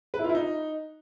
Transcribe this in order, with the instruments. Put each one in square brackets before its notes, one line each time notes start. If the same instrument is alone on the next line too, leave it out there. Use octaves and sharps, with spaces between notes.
[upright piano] B4
E4
F4
E4
D#4